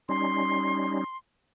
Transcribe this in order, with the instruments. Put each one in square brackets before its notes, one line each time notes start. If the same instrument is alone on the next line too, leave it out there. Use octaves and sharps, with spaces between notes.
[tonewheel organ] G3 C#4 D#4 [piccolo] C6